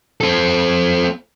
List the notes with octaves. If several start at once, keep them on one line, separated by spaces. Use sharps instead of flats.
C4 A4